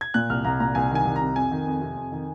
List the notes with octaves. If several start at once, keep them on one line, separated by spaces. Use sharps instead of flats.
G#6
A#2 F#6
C2 F6
C2 A#5
A#2 A#5
C2 G#5
D#3 G#5
C2
A#5
C3
F2 G#5
D#3
F2
C3
F2
D#3